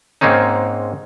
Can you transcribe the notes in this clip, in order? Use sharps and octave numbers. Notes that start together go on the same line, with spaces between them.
G#2 G#3 A#3 C4 C#4 D#4